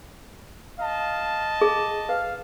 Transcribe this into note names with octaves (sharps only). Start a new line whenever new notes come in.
D#5 F5 A5
G#4
B4 F5